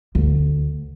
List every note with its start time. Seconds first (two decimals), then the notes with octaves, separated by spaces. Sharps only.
0.15 D2